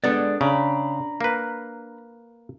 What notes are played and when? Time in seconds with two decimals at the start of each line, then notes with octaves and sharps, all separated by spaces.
0.04 G#3 B3 D4 A4 D5
0.41 C#3 D4 A#5 B5
1.21 A#3 B4